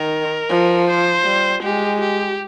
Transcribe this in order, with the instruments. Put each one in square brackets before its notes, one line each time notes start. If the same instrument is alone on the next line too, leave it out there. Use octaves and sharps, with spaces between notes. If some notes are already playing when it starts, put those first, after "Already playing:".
Already playing: [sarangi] D#3 [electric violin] A#4
[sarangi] F3
[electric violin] C5
[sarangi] G3
[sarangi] G#3 [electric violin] G4
[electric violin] G4